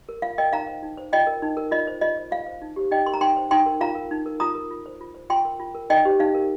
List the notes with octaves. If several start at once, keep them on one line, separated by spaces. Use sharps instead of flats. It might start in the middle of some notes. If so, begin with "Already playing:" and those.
A#4
F4 F5
A#4 D#5 G5
D#4 F5 A#5
C5
D#4
C5
F4 D#5 G5
A#4
D#4
A#4
F4 D#5
C5
F4 D#5
C5
F4 F5
C5
D#4
G4 C5
D#4 D#5 G5
A#4 C6
A#5
D#4 G5 C6
C5
D#4 G5 C6
A#4
F4 F5 A#5
A#4
D#4
A#4
F4 A#5 D#6
A#4
F4
C5
F4
C5
F4 G5 C6
A#4
F4
A#4
D#4 D#5 G5
G4 C5
D#4 F5
A#4